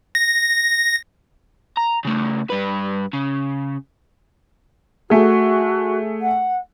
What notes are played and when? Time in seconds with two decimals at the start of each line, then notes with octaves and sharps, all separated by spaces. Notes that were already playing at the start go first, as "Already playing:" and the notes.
0.15 A#6
1.77 A#5
2.05 C#3 A3
2.50 G2 B4
3.13 C#3
5.10 A3 F#4 G#4
6.21 F#5